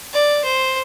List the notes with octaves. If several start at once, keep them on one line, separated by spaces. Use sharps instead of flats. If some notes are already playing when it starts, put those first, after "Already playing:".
D5
C5